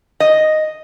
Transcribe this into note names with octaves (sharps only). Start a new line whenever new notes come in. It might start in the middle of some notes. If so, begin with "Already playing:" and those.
D#5